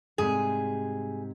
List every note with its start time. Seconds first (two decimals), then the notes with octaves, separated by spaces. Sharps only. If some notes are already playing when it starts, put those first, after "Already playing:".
0.18 G#2 C3 G3 G#4